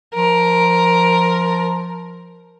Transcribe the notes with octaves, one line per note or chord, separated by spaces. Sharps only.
F3 A#4